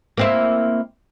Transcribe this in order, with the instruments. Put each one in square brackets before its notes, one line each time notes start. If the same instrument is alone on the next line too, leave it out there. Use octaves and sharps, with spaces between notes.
[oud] A#3 C4 E4